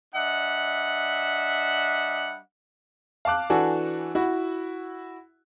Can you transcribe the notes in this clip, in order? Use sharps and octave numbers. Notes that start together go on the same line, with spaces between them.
G3 D4 D#5 E5 F#5
F5 A5 D6 F#6
E3 D4 F#4 A4 G#5
E4 F#4